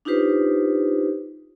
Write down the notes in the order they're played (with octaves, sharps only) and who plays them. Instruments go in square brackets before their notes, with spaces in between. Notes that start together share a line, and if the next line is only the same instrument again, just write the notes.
[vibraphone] D4 D#4 F4 G4 B4 C5